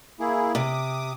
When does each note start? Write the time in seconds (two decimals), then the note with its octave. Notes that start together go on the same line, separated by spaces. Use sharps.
0.20 A#3 E4 G#4
0.55 C3 D6 D#6